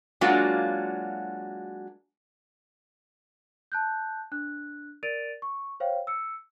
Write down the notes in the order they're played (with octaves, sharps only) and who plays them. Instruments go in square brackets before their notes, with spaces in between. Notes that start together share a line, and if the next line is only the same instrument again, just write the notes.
[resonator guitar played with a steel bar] F#3 G#3 A#3 D4 F4 F#4
[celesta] A5 F#6 G6
D4 F#6
A#4 D5 A6 D7 D#7 F7
C#6
C5 C#5 F5 G5
E6 C#7